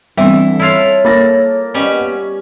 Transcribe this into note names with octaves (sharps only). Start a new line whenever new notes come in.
D3 E3 G3 B3 C4 E5
E4 F4 A4 C#5 F5
A#3 B5 A6 A#6
G3 B3 C#4 D#5